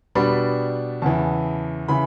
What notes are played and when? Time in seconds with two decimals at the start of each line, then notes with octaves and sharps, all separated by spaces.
0.15 B2 G3 B3 D4 B5
1.02 E2 C#3 E3 A5
1.88 C#3 E3 B5